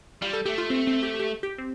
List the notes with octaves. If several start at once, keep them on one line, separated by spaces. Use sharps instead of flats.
G3 F4
A4
A3 G4
F4
C4
C4
G4
G4
G4
C4